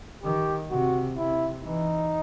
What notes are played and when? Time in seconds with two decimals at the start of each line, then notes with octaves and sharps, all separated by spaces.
0.23 D#3 G4
0.70 C3 F#4
1.17 C3 E4
1.64 E3 D#4